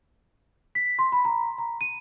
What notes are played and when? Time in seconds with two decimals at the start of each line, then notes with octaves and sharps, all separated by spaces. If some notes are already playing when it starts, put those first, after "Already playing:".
0.75 B6
0.99 C6
1.12 B5
1.25 A#5
1.58 A#5
1.81 D#7